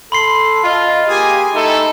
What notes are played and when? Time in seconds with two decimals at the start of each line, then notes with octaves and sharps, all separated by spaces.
0.12 A4 B5 C6 C7
0.64 F4 D#5
1.08 A#3 G4 G#4 G#5
1.54 A3 D#4 E4 A4